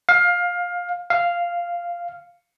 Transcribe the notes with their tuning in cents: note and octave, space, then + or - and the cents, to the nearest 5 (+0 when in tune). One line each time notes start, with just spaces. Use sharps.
F5 +20
F5 -5